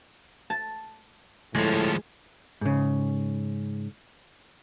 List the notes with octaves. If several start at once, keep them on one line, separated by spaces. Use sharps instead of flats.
A5
D2 A2 F3 G#3
G#2 C#3